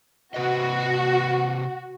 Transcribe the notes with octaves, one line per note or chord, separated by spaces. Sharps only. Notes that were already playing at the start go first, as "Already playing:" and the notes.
C3 F#4 B4 D#5